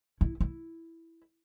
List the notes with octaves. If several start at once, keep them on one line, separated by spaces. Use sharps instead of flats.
E4
E4